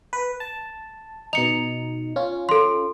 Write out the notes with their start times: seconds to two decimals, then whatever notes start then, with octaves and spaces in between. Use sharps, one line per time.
0.13 B4
0.40 A5
1.33 B2 D#4 C#7 F7
2.16 C#4 F4
2.49 A4 C6